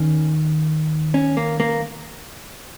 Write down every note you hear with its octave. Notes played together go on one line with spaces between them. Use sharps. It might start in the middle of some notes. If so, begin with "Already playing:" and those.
Already playing: D#2 D#3 C#4
C#4
A#3
A#3